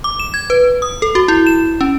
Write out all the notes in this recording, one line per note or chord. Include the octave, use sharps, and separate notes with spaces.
D6
E7
G#6
B4
D#6
A4
F#4
E4
E7
C#4